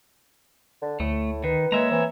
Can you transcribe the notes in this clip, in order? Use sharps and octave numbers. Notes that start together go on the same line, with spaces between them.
D3
D2 A2 A3
D#3 B4
G#3 A#3 C#5 E5 A#5
E3 C4